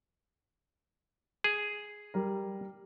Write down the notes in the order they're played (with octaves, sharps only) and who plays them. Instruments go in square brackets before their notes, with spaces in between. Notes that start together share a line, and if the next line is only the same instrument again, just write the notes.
[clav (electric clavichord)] G#4
[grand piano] G3 A#4